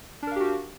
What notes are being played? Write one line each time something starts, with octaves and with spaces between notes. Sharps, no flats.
D4 F#4 G4 A#4 F5